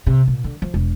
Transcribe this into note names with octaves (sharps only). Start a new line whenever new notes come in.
C3
A#2
D3
F3
E1